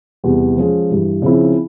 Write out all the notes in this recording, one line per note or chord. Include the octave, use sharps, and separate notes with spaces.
E2 C3 G3
F3 G#3 C#4 F4 G#4
G2 E3 G3
C#3 F3 C4 E4